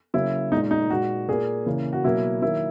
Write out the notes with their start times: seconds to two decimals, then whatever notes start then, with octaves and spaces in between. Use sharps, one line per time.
0.14 C#3 F#3 A#3 E4
0.52 A#2 G#3 D#4
0.71 D#4
0.90 A#2 G#3 F#4
1.28 A#2 A#3 G#4
1.66 C#3 E3 A#3
1.93 F#4
2.04 B2 F#3 A#3 E4
2.42 D#3 F#3 A#3 E4